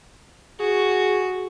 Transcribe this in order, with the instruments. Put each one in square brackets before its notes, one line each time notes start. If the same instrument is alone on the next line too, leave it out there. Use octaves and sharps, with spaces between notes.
[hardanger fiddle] F#4 [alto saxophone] G#4